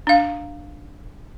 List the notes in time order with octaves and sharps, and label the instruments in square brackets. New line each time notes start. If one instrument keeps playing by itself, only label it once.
[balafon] D4 F5